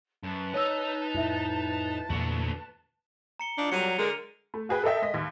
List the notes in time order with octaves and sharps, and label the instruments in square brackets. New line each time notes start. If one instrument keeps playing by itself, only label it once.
[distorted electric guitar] F#2 [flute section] B4 A5
[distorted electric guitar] D#4 D#5 [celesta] C#5 E6
[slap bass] F2 A2 [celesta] E4 E5
[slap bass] E2 A#2 A#3 [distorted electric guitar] D3 F#4
[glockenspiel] A#5 C#7 G7
[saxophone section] E3 D#4 F4 [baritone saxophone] D4
[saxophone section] F2 A#2 G3 [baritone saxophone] F#3 [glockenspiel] C#7 D#7 F7
[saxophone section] D3 A#4 [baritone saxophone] G#3
[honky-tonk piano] A3
F#4 G#4 B4 G5
A4 A#4 D#5 E5 G5
G#3 D#5 B6
D#2